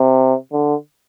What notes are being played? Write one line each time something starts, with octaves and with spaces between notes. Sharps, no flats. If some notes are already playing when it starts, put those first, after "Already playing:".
Already playing: C3
D3